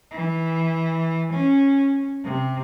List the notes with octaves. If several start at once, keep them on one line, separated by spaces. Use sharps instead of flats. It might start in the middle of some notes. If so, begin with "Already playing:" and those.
E3
C#4
C3